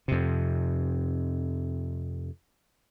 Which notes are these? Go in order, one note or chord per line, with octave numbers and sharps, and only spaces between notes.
F2 C3